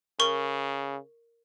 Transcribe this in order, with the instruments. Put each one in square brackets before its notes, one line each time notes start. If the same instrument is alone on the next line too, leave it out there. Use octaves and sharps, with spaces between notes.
[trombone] C#3 [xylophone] A#4 C#6